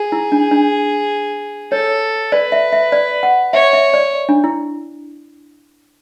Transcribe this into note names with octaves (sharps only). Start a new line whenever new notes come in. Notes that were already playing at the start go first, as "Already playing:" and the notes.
Already playing: G#4
E4
D4
D4
A4 C#5
B4 D5
E5
E5
D5
F#5
C#5 E5
E5
D5
D4
E4